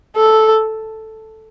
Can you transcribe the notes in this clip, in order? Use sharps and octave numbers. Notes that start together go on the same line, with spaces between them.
A4